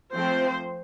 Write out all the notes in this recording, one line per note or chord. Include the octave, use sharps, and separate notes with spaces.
F3 A3 C4 C5